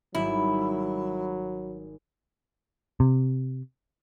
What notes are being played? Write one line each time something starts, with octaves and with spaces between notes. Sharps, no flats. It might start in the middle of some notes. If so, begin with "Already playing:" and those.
G#1 F#3 G3 E4
C3